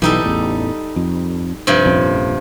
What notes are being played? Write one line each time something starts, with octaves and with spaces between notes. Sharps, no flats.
B1 E3 G3 D#4 A4
A1 E2
F2
G2 C3 F3
A#1 F2 C#4